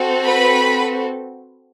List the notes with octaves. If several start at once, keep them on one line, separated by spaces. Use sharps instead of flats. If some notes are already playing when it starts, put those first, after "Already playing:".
Already playing: C4 F#4 A4
B4 B5